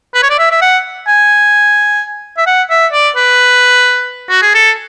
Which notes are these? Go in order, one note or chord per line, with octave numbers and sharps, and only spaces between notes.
B4
C#5
D5
E5
E5
F#5
G#5
E5
F#5
E5
D5
B4
F#4
G#4
A4